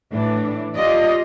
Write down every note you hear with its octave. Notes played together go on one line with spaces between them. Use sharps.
A2 E3 D4
F4 G4 D5 D#5